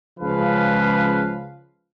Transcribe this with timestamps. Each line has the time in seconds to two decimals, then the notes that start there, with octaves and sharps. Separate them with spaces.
0.19 C#2 C#3 F3 B4 F5